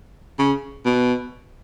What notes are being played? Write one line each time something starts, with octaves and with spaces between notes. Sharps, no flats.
C#3
B2